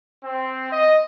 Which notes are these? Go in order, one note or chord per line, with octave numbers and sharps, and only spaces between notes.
C4
D#5